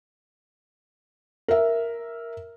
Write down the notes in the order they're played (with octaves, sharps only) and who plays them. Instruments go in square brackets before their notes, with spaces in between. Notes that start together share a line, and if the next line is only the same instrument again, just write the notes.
[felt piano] A#4 E5